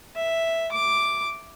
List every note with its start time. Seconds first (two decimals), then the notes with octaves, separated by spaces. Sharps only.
0.16 E5
0.72 D6